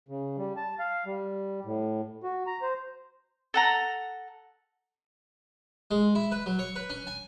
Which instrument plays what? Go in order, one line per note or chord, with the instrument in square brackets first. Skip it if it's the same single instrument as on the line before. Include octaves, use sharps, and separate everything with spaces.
[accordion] C#3
G3
A5
F5
G3
A2
F#4
A#5
C5
[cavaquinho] A4 F#5 A#5
[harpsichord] G#3
E4
B4
F#3
C#5
B4
C#4
G#5